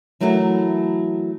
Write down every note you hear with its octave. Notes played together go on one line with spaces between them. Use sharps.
E3 F#3 A3 E4 F#4 A#4